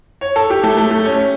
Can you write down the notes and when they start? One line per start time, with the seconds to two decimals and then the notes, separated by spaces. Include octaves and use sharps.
0.21 C#5
0.36 A4
0.50 G4
0.63 A3
0.77 A3
0.91 A3
1.05 C#4